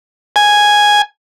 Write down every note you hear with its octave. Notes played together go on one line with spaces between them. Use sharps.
G#5